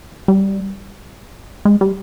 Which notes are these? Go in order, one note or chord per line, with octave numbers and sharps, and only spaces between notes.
G3
G#3
G3